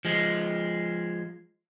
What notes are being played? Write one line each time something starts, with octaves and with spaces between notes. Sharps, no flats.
F3 G#3